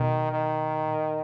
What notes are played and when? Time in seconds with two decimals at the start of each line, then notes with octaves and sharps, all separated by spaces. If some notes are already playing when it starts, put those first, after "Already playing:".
Already playing: B2 D#3
0.33 D#3
0.84 A#2